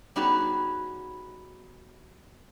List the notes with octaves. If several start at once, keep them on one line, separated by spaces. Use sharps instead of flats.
G3 B3 C#4 D#4 F#4 G#4